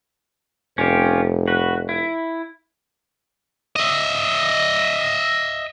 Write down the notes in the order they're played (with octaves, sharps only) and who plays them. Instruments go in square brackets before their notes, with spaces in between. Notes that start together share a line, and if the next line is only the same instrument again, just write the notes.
[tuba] F1 [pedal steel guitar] C#4 F4 G4
[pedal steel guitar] F#4 B4
E4
[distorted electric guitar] D#5 E5